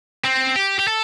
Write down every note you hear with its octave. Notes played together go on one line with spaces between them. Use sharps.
C4
G4
G4
A4